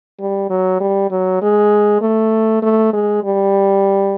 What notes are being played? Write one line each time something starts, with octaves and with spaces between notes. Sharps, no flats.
G3
F#3
G3
F#3
G#3
A3
A3
G#3
G3